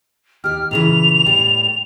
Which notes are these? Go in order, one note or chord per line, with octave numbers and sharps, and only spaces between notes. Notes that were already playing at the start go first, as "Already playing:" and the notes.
D#2 G4 F6
A#2 C#3 E3 F7
A2 G3